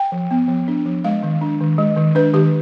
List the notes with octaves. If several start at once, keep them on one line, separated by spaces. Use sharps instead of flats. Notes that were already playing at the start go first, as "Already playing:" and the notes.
Already playing: G5
F3
B3
F3
D4
F3
G#3 F5
D#3
D4
D#3
G#3
D#3
D4 B4
D#3 G4